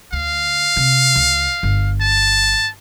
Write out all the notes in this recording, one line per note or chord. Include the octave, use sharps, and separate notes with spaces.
D2 F5
C3
C#2
G1
A5